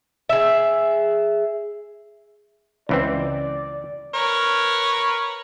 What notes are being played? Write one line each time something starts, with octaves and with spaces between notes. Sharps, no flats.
G#4 E5
C#2 E3 C4 D5
A#4 B4 C#5